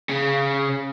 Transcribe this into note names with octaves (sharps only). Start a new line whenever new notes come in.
C#3